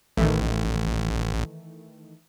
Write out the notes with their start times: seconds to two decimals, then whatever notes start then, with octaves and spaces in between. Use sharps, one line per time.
0.17 A1 D#3 E3 A3